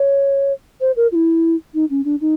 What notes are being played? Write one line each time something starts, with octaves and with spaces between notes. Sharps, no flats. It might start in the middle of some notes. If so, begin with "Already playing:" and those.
Already playing: C#5
C5
A#4
F4
E4
D#4
C#4
D4
D#4